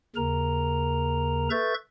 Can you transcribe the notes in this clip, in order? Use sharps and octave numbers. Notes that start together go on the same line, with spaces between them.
D#2 C#3 A#4 A#5
A4 B4 E5 C#6 G6 A6